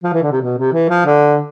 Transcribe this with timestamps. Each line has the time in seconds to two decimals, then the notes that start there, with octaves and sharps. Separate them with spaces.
0.04 F3
0.13 E3
0.22 D3
0.31 C3
0.41 B2
0.58 C3
0.73 E3
0.89 F3
1.05 D3